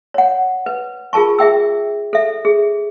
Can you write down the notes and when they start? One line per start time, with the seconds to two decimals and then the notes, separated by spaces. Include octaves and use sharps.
0.14 C#5 F#5
0.66 B4
1.13 F4 G#4 A#4 A5 C#6
1.39 G#4 E5 G5 E6
2.13 A4 E5
2.45 G#4